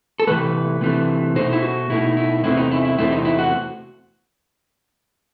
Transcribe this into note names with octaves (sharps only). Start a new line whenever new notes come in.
A4
C3 E3 A3 B4
C3 E3 A3
B2 A3 D#4 C5
E4
F#4
B2 A3 D#4 E4
E4
E2 C3 E3 A3 C4 E4
D#4
E4
E4
E2 C3 E3 A3 C4 E4
D#4
E4
F#4